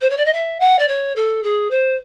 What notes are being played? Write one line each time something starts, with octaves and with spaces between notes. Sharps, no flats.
C5
C#5
D5
D#5
E5
F#5
D5
C#5
A4
G#4
C5